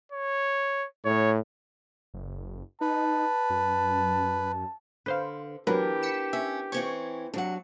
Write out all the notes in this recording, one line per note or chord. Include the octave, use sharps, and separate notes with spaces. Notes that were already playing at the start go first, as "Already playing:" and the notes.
C#5
A2 C#5
F#1
D#4 B4 A5
F#2
D3 B4 C5 F5
E3 F#3 B3 D4 G4 A#4 B4
B6 C#7 E7
C#4 E5
E3 C4 C#4 C#6 G#6
C3 F#3 D4 F#5